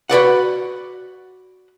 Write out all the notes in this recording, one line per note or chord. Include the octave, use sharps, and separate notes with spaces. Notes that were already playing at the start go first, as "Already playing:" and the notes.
F#4 B4 D5 F#5